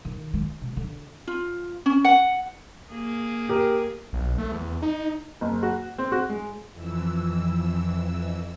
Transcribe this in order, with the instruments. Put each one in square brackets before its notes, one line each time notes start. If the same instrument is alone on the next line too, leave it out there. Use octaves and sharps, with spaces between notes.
[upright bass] D#3
G#3
C3
D3
[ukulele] F4
C#4
F#5
[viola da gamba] A#3 G#4
[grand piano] G4 A#4
[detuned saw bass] B1
A3
E2
D#4
[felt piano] F#1
F#4
C4
F#4
G#3
[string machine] F2 E3 E6